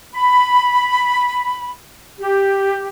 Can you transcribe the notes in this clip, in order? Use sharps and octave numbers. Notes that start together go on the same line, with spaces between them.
B5
G4